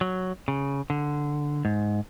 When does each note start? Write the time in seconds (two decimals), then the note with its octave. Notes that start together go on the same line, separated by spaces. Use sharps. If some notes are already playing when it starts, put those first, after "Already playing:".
0.01 F#3
0.48 C#3
0.90 D3
1.65 G#2